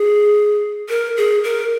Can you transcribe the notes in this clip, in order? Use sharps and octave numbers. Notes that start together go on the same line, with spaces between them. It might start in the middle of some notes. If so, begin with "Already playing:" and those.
Already playing: G#4
A#4
G#4
A#4